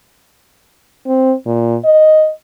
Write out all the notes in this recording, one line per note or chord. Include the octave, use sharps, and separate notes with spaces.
C4
A#2
D#5